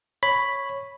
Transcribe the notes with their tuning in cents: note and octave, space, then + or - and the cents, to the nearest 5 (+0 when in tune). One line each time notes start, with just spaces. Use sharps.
C#5 -5 B5 +0